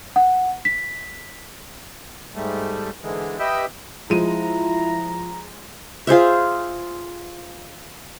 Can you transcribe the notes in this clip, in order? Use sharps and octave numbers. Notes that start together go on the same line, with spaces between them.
F#5
B6
G#2 G3 A3
G#2 D3 E3 G#3
G4 B4 D#5 E5 G5 E6
F3 G#3 E4 A#5 D#7
F4 G#4 C5 E5